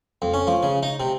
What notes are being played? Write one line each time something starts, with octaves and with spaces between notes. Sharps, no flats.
F2
C#4
F3
C#3
D#4
C3